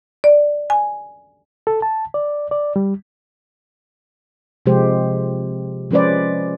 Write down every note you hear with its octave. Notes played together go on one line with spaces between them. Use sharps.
D5
G#5
A4
A5
D5
D5
G3
C3 F3 G#3 G4 C5
F3 G#3 C#4 B4 C5 D5